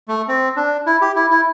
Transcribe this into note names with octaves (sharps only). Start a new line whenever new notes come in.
A3
C4
D4
E4
G4
E4
E4